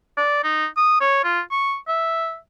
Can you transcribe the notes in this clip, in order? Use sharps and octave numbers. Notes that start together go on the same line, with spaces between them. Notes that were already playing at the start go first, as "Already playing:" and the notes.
D5
D#4
D#6
C#5
F4
C#6
E5